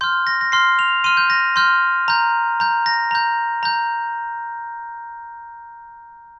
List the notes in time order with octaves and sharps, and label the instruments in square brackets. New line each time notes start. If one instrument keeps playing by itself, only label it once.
[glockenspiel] C6 F6 G6
A#6
A#6
C6 F6 C7
F7
C6 F6 D#7
G6
A#6
C6 F6 G6
A#5 G6
A#5 G6
A#6
A#5 G6
A#5 G6